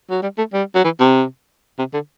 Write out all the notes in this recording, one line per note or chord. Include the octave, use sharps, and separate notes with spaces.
F#3
G3
A3
G3
F#3
E3
C3
C3
D3